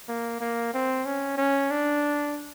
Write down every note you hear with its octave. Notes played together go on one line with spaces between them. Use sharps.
A#3
A#3
C4
C#4
C#4
D4